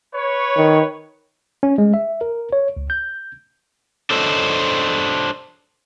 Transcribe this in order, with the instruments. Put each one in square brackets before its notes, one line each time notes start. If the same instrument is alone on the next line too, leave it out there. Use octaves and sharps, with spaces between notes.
[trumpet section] B4 C#5
[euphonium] D#3
[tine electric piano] C#4
G#3
E5
A#4
C#5
C#2
G6
[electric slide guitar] D4 A4 C5 C#5 D#5